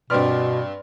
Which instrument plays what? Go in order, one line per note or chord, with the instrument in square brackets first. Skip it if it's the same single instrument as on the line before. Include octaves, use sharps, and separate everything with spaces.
[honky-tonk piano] G2 C4 F6 [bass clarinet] B2 [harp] B4 D5 C6